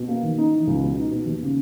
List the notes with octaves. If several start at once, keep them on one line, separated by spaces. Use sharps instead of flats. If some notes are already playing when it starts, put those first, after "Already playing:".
Already playing: B2
A#3
D#3
D#4
E3
C#2
B2
D#4
B2
D#2
C#3